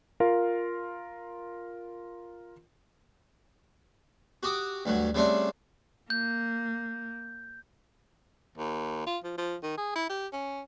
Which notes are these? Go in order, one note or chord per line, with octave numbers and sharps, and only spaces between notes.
F4 A#4 F5
F#4 G4 D6 D#6
D2 G2 F#3
C#3 G3 A3 C4 D4
A#3 G6
D#2
F4
F3
F3
D#3
G#4
E4
G4
C#4